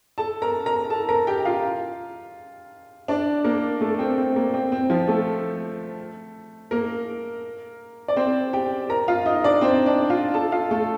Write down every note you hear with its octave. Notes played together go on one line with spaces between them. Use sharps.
A4 A5
A#4 A#5
A#4 A#5
A4 A5
A#4 A#5
G4 G5
F4 F5
D4 D5
A#3 A#4
A3 A4
C4
C4
A#3
C4
C4
F3 F4
A3 A4
A#3 A#4
D5
C4 C5
G4 G5
A#4 A#5
F4 F5
D#4 D#5
D4 D5
C4 C5
D4 D5
F4 F5
A4 A5
F4 F5
A3 A4